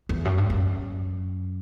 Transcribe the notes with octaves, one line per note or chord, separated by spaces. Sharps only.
E2
F#2
G2
F#2